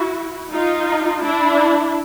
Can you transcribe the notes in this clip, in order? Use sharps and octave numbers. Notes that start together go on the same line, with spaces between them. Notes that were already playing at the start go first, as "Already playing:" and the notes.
Already playing: E4 F#4
D#4 F4
D4 E4